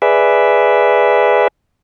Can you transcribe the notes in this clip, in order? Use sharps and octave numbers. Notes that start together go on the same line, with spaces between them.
G#4 B4 D5 E5